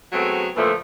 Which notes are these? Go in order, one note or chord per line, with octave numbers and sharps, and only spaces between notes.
F#3 G#3 A3 B3 C4 G#4
A#2 D3 E3 F3 A3